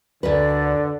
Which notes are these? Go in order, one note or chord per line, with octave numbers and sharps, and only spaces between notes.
D2 D3 A#4 B4 D5